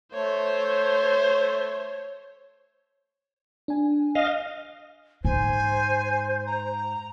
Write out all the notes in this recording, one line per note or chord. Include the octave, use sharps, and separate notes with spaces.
A3 C5 C#5
D4 G#5
D#5 F5
G#2 C5 G#5
A#5